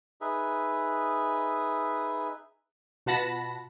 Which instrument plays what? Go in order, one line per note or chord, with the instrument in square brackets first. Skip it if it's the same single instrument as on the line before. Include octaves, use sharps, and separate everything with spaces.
[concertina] D#4 G#4 B4 E5
[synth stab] B2 F4 F#5 A5 B5 A#6